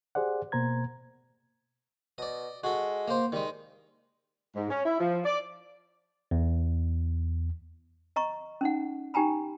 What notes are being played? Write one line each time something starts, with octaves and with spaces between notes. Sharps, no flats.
G4 G#4 C5 D5 F#5
B2 A#3 C5 A#5 G#6
B2 D5 D#5
G#3 F#4 A4
A#3 C5
D#3 G3 G#3
G#2
C#4
E4
F3
D5
E2
D#5 A#5 C#6
C#4 D#4 F#5
D#4 G4 G5 G#5 A#5 B5